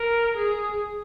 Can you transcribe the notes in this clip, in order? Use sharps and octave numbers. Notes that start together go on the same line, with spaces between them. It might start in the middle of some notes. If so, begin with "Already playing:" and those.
Already playing: A#4
G#4